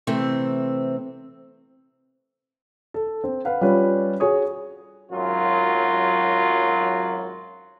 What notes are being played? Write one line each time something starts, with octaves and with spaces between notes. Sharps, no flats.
C3 E3 A3 C4
A4
C4
B4 F5 F#5
G3 C#4 F4 G4 B4 C#5
F#4 G#4 C#5 D#6
G#1 F#2 F#3 F4